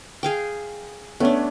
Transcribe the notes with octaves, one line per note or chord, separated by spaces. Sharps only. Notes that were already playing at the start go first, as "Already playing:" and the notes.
G#4 F5 G5
A3 B3 C#4 D4